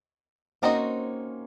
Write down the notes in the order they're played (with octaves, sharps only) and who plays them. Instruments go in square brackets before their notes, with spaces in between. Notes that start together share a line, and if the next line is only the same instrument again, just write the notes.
[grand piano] A#3 C#4 [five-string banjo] C4 D#4 F#4 C5 D#5